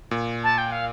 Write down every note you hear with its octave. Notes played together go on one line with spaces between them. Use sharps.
A#2
A5
G5
F5